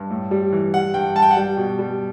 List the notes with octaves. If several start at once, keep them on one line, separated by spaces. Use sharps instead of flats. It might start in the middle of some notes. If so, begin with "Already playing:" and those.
Already playing: G2
A2
G3
E3
G3 F#5
G2 G5
G2 A5
G5
F#5
G3 G5
B2
G3